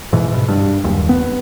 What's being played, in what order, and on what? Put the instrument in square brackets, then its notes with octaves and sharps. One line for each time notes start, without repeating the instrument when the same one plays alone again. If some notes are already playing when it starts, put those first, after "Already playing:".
[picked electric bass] G#2 B2 E3
B2
G2
F#1 D#2
B3